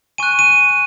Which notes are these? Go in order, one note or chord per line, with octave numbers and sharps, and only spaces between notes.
G#5 C#6 F#6 D#7
D#7